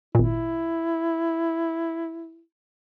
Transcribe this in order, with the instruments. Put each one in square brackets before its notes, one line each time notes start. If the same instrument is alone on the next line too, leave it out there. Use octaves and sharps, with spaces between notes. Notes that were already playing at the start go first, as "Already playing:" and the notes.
[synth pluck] G#1 A#2 [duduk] E4